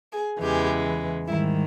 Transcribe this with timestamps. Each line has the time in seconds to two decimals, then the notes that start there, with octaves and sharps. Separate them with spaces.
0.12 G#4
0.40 E2 C#3 E3 G#3 G4
1.26 G#2 D#3 G3 E4